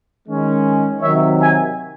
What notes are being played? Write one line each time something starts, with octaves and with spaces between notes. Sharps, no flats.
D#3 G#3 C#4
C3 D#3 F#3 C#5 E5
E5 G#5